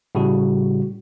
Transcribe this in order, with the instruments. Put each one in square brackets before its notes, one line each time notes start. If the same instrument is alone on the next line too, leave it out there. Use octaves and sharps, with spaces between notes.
[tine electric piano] A2 C#3 G3 F#4